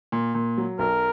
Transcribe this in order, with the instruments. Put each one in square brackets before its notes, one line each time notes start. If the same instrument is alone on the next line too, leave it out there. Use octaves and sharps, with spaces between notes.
[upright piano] A#2
A#2
F#3
[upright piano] B1 [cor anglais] A#4